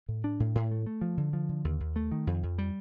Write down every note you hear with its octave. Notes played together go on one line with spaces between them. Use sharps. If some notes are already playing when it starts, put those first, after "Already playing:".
A2
D4
A2
A2
A3
A3
F3
D3
F3
D3
D#2
D#2
A3
D#3
F2
F2
G3